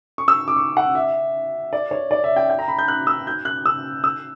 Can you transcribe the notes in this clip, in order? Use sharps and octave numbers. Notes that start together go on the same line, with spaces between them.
C#6
E6
D6
C#6
F#5
E5
D5
C#5
D5
E5
G5
G5
A#5
B5
G6
F#6
E6
G6
F#6
E6
E6